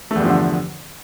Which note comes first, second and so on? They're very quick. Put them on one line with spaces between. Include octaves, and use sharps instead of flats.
A3 E2 G2 F3 D3